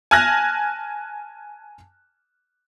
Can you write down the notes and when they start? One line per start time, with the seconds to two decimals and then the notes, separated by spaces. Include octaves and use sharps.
0.11 G#5 A5 F6 F#6 G#6 A#6